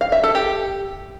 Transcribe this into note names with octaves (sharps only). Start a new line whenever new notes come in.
F5
E5
A4
G4